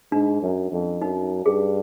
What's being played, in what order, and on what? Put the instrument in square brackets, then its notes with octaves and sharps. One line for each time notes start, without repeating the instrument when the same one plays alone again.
[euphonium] G#2 [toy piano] D4
[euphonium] F#2
F2
[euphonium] F#2 [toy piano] D#4
[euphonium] G2 [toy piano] G#4